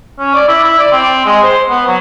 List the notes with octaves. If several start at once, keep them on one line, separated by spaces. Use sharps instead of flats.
C#4
D5
E4
E4
D5
C4
G#3
C5
B3
F#3